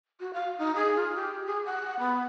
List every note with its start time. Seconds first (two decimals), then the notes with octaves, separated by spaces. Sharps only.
0.20 F#4
0.34 F5
0.59 D#4
0.76 G#4
0.96 F4
1.15 G4
1.46 G#4
1.65 F#5
1.99 B3